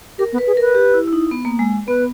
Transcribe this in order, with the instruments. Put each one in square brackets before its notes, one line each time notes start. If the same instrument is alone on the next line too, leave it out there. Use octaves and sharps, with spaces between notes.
[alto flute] G4 [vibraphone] A#4
[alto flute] B3
[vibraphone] B4
[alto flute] G#4
[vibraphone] A#4 [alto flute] B4
[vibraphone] G4
E4
E4
D#4
B3
A#3
G#3
[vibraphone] B3 [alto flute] B4